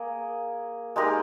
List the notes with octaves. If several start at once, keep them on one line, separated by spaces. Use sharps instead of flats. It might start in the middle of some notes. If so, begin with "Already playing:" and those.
Already playing: A#3 G#4
G#3 D#4 G4 A#4